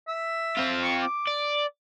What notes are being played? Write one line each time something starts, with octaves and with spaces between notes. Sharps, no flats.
E5
C4 F4
C#6
D6
D5